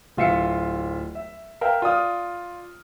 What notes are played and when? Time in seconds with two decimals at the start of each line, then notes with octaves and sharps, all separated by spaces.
0.17 D1 F4 E5 C7 C#7
1.15 E5
1.61 A#4 E5 F5 G5
1.82 F4 D5 D#6 F6